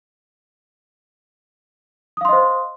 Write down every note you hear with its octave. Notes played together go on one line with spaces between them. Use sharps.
C5 D#5 F5 C6 D#6